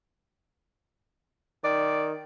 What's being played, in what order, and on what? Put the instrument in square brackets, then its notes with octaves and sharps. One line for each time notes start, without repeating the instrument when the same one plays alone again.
[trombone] D#3 [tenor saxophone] D5